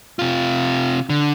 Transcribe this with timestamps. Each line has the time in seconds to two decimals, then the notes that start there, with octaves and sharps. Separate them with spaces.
0.19 C3 F4
1.10 D3